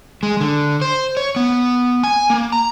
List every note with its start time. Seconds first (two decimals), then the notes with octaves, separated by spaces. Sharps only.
0.23 G#3
0.41 D3
0.82 C5
1.17 C#5
1.36 B3
2.04 G#5
2.30 A#3
2.52 A#5